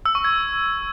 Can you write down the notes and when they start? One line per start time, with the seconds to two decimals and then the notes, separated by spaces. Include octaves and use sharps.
0.06 E6
0.15 C#6
0.24 G#6